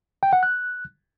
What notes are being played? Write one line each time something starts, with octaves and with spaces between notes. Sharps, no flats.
G5
F#5
F#6